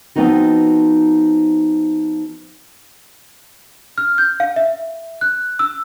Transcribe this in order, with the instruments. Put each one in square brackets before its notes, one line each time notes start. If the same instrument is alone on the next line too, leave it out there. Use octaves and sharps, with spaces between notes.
[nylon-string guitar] F3 B3 C4 D#4 F#4
[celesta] F6
G6
F5
E5
F#6
E6